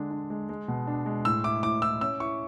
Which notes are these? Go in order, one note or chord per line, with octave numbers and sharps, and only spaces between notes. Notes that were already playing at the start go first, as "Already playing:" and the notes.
Already playing: D3 G#3 D4
D4
G#3
G#3
B2
D4
G#3
A2 E6
E4 D6
A2 D6
E4 E6
C#4 E6
E4 C#6